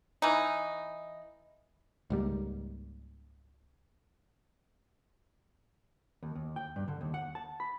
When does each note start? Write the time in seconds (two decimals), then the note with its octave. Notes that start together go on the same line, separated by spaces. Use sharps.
0.22 E3 D#4
2.10 C#2 G#2 G3 A#3
6.23 D#2
6.35 D#2
6.56 G5
6.76 G2
6.88 D3
7.01 D#2
7.14 F#5
7.35 A5
7.60 B5